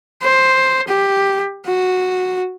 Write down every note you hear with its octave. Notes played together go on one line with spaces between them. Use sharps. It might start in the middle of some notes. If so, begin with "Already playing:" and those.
C5
G4
F#4